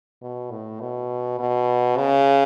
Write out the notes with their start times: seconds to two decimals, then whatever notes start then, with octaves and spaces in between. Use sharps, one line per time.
0.22 B2
0.51 A2
0.80 B2
1.39 B2
1.98 C#3